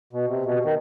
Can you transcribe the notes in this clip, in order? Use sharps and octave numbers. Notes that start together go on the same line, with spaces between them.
B2
C3
B2
D#3